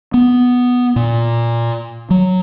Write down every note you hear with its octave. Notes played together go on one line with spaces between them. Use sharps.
B3
A#2
F#3